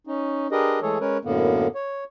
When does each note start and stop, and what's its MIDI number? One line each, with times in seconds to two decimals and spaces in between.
0.07 0.47 61
0.07 0.47 63
0.52 0.80 62
0.52 0.80 67
0.52 0.80 68
0.52 0.80 70
0.52 0.80 71
0.52 0.80 75
0.82 0.98 52
0.82 0.98 56
0.82 0.98 57
0.82 0.98 68
0.82 0.98 69
0.82 0.98 73
1.01 1.18 56
1.01 1.18 61
1.01 1.18 70
1.01 1.18 71
1.01 1.18 73
1.25 1.67 42
1.25 1.67 45
1.25 1.67 50
1.25 1.67 58
1.25 1.67 59
1.75 2.04 73